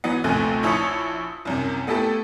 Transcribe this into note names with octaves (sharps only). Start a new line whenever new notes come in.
E3 F#3 B3
A#1 D#2 C3 A3 G#5 F#6
A#1 E4 C#5 A5 D#6 C#7
C2 F#2 C3
A3 B3 E4 G4 A4